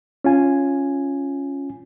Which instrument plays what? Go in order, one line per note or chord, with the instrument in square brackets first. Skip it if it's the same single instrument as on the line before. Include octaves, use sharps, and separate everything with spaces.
[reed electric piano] C#4 F4 G#5